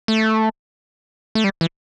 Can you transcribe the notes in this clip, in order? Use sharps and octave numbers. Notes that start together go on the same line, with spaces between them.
A3
A3
G3
E3